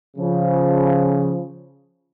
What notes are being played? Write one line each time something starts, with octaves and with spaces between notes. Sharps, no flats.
C#3 F3